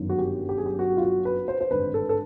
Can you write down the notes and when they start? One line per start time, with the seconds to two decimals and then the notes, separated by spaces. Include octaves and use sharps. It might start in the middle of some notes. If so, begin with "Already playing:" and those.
Already playing: G1 F#2 D#3
0.10 F#4
0.18 G4
0.49 G4
0.58 G#4
0.66 G4
0.79 F#4
0.97 F4
1.02 F#4
1.25 B4
1.48 C5
1.61 C5
1.71 G#1 G2 D3 B4
1.94 A4
2.09 A4